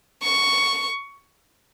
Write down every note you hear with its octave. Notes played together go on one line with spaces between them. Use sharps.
C#6